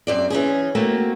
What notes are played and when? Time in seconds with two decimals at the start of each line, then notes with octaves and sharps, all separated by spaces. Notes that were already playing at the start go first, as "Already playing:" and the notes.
0.07 F#2 C4 D5
0.30 E3 C#4 G#4
0.75 A3 A#3 C4 F#4